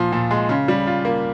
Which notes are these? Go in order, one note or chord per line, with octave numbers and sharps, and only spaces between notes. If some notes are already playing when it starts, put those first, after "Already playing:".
Already playing: A#2 F3
A#2
G#3
C#3
G3
F4
A#3